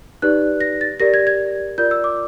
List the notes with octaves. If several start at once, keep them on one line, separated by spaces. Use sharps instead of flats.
D#4 G4 B4 D5 F#6
A#6
A6
G4 A#4 D5 A#6
G#6
G#6
F4 A#4 D5 G6
E6
D6